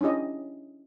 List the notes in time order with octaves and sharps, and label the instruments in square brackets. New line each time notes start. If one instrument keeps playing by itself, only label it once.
[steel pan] C#4 D4 E4 G4 D#5